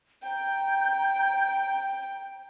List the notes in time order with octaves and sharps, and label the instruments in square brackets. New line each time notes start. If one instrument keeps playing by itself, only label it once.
[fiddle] G5 [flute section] A#5 G6